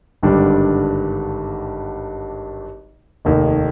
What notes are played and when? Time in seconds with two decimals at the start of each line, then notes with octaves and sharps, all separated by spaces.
0.23 G#1 G2 D3 G3 D4
3.25 F1 D#2 D#3